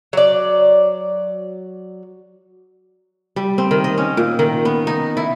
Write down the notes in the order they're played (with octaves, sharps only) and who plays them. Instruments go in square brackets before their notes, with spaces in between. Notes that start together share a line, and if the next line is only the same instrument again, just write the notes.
[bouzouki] F#3 D5
[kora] G3
C4
D#3
D#5
C#4
A#2
D#3
B3
D#4
E4